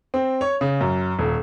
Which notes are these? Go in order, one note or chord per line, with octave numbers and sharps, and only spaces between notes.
C4
C#5
C#3
F#2
D#1